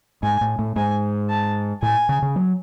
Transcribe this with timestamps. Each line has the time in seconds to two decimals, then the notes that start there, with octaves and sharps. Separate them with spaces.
0.23 G#2 G#5
0.41 A2
0.59 A2
0.76 G#2 G#5
1.30 A5
1.82 A2 G#5
2.09 C#3
2.22 C#3
2.36 F#3